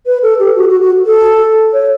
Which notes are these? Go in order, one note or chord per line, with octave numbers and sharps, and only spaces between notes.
B4
A4
G4
F#4
F#4
F#4
A4
C#5